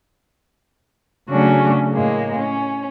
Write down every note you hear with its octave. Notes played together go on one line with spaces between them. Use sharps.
C#3 F#3 A3 C#4 D4 F#4
A2 G#3 A#3
C#4